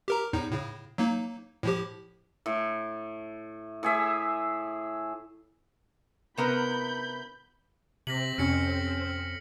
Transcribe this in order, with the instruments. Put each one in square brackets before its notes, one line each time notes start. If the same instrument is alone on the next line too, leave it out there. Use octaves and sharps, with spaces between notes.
[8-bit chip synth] G4 A#4 A#5
E2 A2 D#4
A2 C#3
F#3 A#3 D#4
A2 F3 G4
[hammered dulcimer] A2
A2 G#4 E5
[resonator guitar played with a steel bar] C3 B3 A#4 [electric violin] B5 G6
[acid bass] C3 [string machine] C4 [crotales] A#6 B6 F#7
[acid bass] F2 [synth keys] C3 C#4 [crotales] F6 C#7